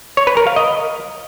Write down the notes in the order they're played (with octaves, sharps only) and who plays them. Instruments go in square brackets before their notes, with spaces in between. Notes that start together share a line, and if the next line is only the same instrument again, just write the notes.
[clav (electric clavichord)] C#5
B4
A#4
F5
D#5